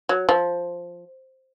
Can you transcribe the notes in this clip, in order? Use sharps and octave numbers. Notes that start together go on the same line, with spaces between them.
F#3
F3